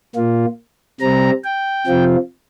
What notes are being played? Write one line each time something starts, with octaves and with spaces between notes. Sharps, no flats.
A#2 A#3 F4
C3 G3 C4 A#5
G5
C3 F3 C4 F4